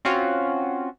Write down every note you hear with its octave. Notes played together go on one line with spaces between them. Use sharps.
C4 C#4 F4 F#4